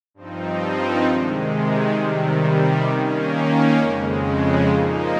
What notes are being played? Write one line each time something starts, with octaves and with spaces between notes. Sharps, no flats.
G2 F3 C4 D#4
C3 D#3 G#3
C3 D#3 G3
D#3 A#3 C#4
F2 C#3 G#3
A#2 F3 A#3 D#4